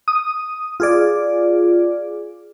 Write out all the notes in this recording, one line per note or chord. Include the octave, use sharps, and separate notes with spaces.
D#6
F4 G#4 D5